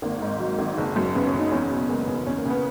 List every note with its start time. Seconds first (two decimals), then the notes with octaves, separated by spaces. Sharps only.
0.02 G#1 A#3
0.22 G#2
0.40 F#3
0.59 G#1
0.78 F#1
0.96 F#2
1.14 C#3 B3
1.27 C#4
1.33 F#1
1.40 D#4
1.52 E2 C#4
1.70 B2
1.89 G#3 A#3
2.01 B3
2.08 E2
2.14 B3
2.26 E2 C#4
2.38 A#3
2.45 C#3
2.50 B3